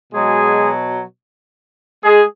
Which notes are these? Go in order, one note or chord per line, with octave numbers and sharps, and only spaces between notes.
B2 F#3 G#3 G#4
G#3 G#4